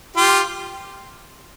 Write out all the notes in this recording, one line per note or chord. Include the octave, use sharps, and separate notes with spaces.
F4 G4